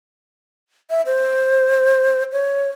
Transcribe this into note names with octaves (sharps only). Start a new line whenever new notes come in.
E5
C5
C#5